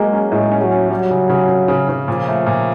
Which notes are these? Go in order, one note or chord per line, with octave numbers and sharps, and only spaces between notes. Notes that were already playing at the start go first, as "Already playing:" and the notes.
Already playing: F#3 G#3 A#3
C#4
A2 G#3
C#4
F#3
C#4
F#3 G3
C#3
C#3
C#3
C#3
C#3
A#2 F3
A3
A#2